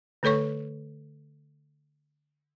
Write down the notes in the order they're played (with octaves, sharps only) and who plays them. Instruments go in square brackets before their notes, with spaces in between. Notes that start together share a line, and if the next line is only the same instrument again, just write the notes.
[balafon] D3 A3 A4 C#5 C#6